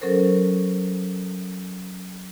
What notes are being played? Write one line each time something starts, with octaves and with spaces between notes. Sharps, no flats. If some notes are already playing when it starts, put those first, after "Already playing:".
F#3 C#4 A4 A#4 C5